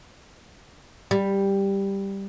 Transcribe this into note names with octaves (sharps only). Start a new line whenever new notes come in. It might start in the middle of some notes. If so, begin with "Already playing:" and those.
G3